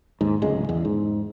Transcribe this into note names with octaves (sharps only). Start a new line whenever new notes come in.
D#2 G#2
D1 C#2 G#3
E2
G#2